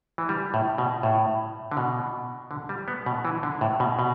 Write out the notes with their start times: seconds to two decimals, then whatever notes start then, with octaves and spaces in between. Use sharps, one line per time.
0.18 E3
0.29 G3
0.54 A2
0.78 B2
1.03 A2
1.71 D3
1.77 B2
2.51 D3
2.69 G3
2.88 B3
3.06 B2
3.25 E3
3.43 D3
3.61 A2
3.80 B2
3.99 B2